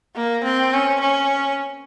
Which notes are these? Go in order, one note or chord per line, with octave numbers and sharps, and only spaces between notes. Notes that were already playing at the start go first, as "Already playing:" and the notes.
A#3
C4
C#4
C#4